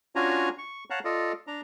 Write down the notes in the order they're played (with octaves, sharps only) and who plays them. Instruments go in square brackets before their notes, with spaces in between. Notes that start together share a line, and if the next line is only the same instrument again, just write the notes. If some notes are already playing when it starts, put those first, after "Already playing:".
[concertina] C#4 D4 F4 F#4 G#5 A#5
C#6
C#5 F5 F#5 A5 A#5
F4 A4 D5 D#5
D4 A#5